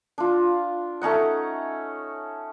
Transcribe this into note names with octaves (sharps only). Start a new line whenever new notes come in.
D4 F4
A3 C#4 D#4 F#5